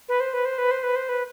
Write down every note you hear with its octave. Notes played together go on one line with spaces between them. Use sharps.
B4
C5
B4
C5
B4
C5
B4
C5
B4